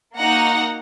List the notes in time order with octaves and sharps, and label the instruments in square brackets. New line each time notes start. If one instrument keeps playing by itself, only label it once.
[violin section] A#3 D#4 F#4 F#5 A#5